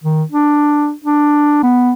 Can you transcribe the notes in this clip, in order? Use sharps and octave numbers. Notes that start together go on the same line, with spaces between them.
D#3
D4
D4
B3